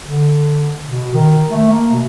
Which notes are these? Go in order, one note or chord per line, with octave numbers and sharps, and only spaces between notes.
D3
B2
D#3
A3
A#3
B2